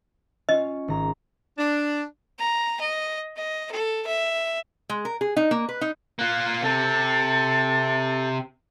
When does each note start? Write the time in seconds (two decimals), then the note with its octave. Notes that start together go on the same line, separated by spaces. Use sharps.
0.49 C#4 F4 D#5
0.88 G#1 A#5
1.58 D4
2.39 A#5
2.80 D#5
3.37 D#5
3.72 A4
4.07 E5
4.89 G#3
5.05 A#4
5.21 G#4
5.36 D#4
5.51 A#3
5.69 B4
5.81 D#4
6.19 A#3 F4 F#6
6.62 C3 C4 A4